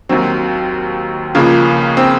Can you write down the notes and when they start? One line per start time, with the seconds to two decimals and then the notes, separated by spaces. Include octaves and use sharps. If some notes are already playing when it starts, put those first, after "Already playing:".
0.09 D#2 D#3 F#3 C4
1.35 C#2 C#3 F3 A#3
1.97 C4